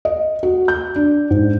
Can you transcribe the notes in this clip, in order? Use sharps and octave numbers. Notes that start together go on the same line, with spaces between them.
D#5
F#4
G6
D4
G#2